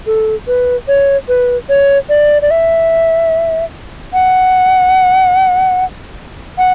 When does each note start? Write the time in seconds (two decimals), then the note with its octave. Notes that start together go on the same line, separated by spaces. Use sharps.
0.06 A4
0.47 B4
0.88 C#5
1.28 B4
1.69 C#5
2.09 D5
2.42 D5
2.51 E5
4.13 F#5
6.58 F#5